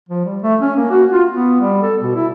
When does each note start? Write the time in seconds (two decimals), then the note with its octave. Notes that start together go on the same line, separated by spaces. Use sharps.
0.09 F3
0.25 G3
0.42 A3
0.60 C#4
0.76 A#3
0.90 F#4
1.12 F4
1.30 B3
1.60 G3
1.82 A4
2.01 B2
2.15 E4